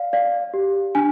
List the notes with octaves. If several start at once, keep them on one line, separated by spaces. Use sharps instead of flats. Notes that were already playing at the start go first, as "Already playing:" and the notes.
Already playing: D5 F5
D5 F5
G4
D4 G#5